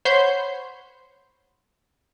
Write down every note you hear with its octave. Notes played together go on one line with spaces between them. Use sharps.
C5 C#5 F#5 B5 C6 G6